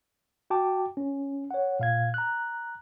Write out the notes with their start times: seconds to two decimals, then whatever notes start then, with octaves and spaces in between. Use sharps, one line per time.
0.50 F#4 G5 A5 D6
0.97 C#4
1.51 C#5 F#5
1.80 A#2 F5 G#6
2.14 A#5 F#6